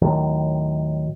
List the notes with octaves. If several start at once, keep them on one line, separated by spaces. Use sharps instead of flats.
D#2 A2 D#3 F#3